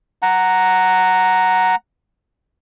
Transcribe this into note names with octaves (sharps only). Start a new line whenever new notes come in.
F#5 A#5